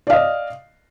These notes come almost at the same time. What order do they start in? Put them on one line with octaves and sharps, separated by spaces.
D5 F5 D#5